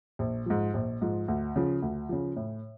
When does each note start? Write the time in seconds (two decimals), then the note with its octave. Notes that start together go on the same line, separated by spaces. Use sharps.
0.19 A#1
0.46 G#2 F3
0.74 A#1
1.01 G#2 F3
1.28 D2
1.56 C#3 F3
1.82 D2
2.09 C#3 F3
2.36 A2